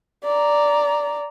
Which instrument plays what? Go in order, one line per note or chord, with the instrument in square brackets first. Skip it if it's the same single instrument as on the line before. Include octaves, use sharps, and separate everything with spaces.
[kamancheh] D5 A#5